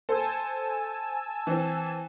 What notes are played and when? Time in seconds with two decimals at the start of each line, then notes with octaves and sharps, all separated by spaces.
0.09 A4 C5 G#5 A5 E6
1.47 E3 C4